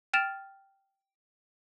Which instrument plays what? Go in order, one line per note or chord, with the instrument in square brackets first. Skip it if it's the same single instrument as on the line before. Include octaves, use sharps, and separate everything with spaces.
[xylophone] G5 F6 A6 D7 E7 F7